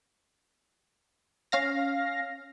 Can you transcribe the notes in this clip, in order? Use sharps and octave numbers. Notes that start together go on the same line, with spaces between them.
C#4 F5 A#6